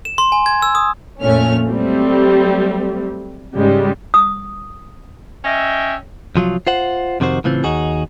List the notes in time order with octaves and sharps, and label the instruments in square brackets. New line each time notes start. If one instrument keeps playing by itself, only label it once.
[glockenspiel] E7
C6
G#5
G#6
E6
D#6
[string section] F2 A#2 A3 C#4 F6
F#3 G3 A3 C4
G#2 C#3 G3 G#3
[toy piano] D#6
[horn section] C#4 D#5 E5 G5
[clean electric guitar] C2 F3 F#3 F4
F4 C5 F#5
F2 C3 D#3 F#4 C5
A2 C#3 E3 C4 F4
D#2 D#4 F#4 G#4